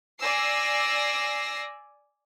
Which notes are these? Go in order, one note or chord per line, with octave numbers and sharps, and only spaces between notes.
D5 G#5 E6 A#6 C7